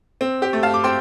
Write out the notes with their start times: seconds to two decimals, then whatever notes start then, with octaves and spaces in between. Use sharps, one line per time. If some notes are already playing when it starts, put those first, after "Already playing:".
0.21 C4
0.42 G4
0.53 A3
0.63 F5 A5
0.74 D6
0.84 C4 G5 C6